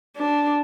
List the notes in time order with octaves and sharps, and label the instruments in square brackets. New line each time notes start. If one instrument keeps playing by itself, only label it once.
[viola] D4